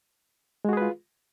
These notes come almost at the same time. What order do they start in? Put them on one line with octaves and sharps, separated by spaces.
G#3 F#4 G#4 B4 F4